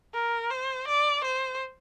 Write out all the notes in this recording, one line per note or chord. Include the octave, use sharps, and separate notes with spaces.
A#4
C5
D5
C5